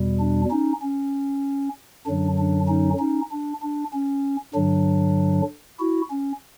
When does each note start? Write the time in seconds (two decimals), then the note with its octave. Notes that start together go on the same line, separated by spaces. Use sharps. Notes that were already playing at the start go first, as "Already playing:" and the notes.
Already playing: E2 B2 G3
0.20 D4
0.51 C#4 D#4
0.82 C#4
2.06 F#2 D3 F#3 D4
2.38 D4
2.68 C#4 D#4
2.99 C#4 D#4
3.31 D4
3.62 D4
3.93 C#4
4.55 G2 D3 F#3 D4
5.80 E4 F#4
6.10 C#4